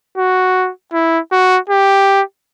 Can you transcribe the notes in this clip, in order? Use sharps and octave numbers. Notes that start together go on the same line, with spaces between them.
F#4
E4
F#4
G4